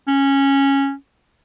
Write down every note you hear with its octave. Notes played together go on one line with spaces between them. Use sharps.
C#4